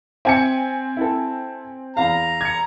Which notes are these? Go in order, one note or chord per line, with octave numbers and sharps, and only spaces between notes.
C4 E5 G#5 C#7
E4 A4
E2 F5 A#5
G#6 C#7